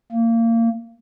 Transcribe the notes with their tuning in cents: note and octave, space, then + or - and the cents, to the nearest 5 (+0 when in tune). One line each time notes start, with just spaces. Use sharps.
A#3 -25